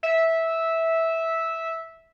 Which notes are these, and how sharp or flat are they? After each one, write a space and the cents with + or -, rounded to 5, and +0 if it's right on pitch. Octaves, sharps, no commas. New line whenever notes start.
E5 -10